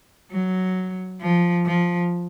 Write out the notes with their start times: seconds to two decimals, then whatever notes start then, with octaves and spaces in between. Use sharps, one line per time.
0.32 F#3
1.21 F3
1.66 F3